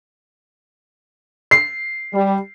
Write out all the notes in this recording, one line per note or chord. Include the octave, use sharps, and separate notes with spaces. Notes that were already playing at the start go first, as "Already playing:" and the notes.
C7
G3